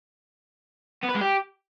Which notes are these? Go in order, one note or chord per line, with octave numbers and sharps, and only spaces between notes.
B3
B4
G#3
G4